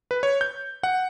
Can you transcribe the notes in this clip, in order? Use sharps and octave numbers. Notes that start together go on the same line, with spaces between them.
B4
C#5
G6
F#5